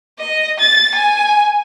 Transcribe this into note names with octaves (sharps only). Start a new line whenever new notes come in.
D#5
A6
G#5